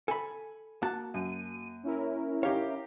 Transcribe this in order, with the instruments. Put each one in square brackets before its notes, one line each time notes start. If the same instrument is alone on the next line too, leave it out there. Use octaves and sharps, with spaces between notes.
[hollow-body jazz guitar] A4 B5 [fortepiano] G#5
[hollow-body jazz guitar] A#3 F#4 A5
[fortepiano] F#2 [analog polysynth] D#7
[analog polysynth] C#4 E4 A#4
[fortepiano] D#4 G4 F5 [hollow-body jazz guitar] C#5